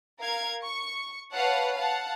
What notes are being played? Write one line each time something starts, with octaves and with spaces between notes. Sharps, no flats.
A#4 F5 G#6
C#6
B4 C#5 F5 F#5 A5
F5 F#5 A5